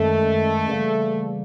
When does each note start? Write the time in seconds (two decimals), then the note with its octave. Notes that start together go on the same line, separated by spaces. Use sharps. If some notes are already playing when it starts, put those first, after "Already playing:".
Already playing: F#2 D#3 G#3 A3
0.67 C#3 E3 G3 A#3